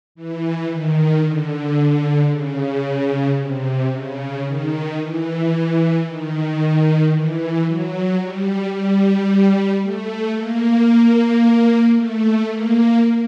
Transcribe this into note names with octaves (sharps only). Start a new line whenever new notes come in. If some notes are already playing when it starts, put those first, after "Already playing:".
E3
D#3
D3
C#3
C3
C#3
D#3
E3
D#3
E3
F#3
G3
G3
A3
A#3
A3
A#3